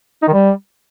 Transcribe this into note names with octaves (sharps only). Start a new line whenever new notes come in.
D#4
D#3
G3